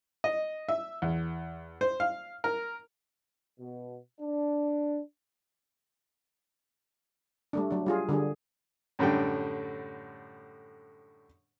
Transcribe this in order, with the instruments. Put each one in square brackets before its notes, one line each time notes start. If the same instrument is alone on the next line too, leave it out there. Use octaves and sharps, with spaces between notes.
[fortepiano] D#5
E5
E2
C5
F5
A#4
[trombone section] B2
D4
[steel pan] G3 A3 D4
F#3 D4
G3 F4 G#4
D3 G3 D4 G#4
[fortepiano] F#2 A2 D3 G3 G5